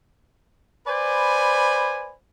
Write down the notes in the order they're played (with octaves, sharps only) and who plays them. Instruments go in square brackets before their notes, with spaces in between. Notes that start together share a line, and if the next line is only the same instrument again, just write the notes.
[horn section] B4 C5 D5 G#5 B5